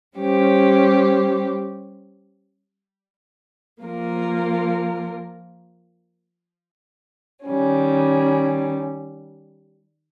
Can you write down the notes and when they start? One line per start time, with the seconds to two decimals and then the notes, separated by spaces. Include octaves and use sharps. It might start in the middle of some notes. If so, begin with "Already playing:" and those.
0.17 G3 C#4 G4 C5
3.81 F3 A#3 F4 A#4
7.45 D#3 G3 C#4